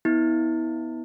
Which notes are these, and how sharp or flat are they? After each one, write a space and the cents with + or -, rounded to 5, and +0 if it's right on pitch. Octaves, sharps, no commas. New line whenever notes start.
B3 +0 E4 -35